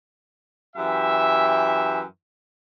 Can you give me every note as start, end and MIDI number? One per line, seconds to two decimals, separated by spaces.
0.76 2.01 42
0.76 2.01 52
0.76 2.01 67
0.76 2.01 76